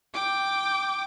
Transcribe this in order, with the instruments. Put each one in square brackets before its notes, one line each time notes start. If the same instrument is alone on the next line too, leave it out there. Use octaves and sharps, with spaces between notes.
[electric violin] G5 D6